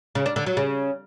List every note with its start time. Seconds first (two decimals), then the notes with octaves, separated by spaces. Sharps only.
0.15 C#3
0.26 D4
0.36 D3
0.46 F#3
0.57 C#3